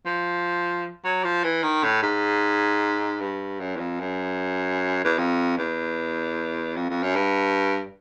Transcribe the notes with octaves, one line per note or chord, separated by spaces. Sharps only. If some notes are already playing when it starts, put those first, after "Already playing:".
F3
F#3
F3
E3
D#3
A2
G#2
G2
F#2
E2
F2
F#2
E2
F2
E2
F2
F2
F#2
G2